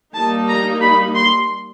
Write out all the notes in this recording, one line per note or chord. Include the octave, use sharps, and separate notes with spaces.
G3 A#3 D#4 A5
A#5
B5
C6